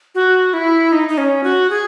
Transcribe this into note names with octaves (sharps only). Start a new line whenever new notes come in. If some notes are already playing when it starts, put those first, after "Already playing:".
F#4
E4
D#4
D#4
C#4
F#4
G#4